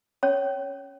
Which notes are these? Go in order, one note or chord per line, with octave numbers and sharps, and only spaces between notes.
C#4 C#5